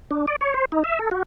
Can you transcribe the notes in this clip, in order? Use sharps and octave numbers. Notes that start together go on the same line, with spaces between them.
D4
D5
C#5
C5
D#4
E5
A4
F#4